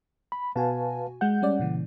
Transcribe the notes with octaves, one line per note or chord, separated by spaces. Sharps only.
B5
B2 F#4 B4 F5 G#5 A5
G#3 F#5 G6
G3 C#4 D5
A#2 C#3 E3